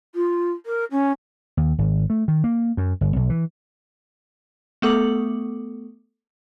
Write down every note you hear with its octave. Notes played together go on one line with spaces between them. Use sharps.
F4
A#4
C#4
D#2
G#1
A3
D#3
A#3
F#2
G1
B1
E3
A3 B3 A4 D6 F#7